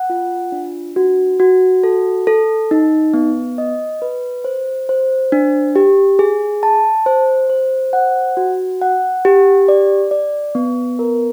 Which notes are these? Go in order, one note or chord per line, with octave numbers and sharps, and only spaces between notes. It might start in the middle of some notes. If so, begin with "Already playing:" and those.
Already playing: F#5
F4
D4
F#4
F#4
A4
A4
D#4
B3
D#5
B4
C5
C5
D4
G4
G#4
A5
C5
C5
F#5
F#4
F#5
G4
D5
D5
B3
A#4